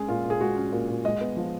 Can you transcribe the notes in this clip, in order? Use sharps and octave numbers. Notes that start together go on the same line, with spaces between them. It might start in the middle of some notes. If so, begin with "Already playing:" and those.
Already playing: G#3 C#4 G#4
A#2 F4
A#2
G#4
G#3 F#4
C#4
A#2
A#2
G#3 D#5
B3
F3